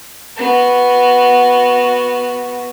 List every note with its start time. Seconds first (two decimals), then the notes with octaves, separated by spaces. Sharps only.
0.37 B3 F#4